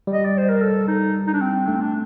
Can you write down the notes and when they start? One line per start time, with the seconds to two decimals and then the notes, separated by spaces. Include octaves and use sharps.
0.07 G3
0.13 D#5
0.25 D5
0.38 C5
0.49 A#4
0.61 A4
0.88 D#4
1.27 D#4
1.34 D4
1.41 C4
1.67 A3 D4
1.75 C4
1.81 D4